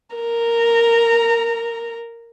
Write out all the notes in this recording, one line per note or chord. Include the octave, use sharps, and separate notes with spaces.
A#4 A#5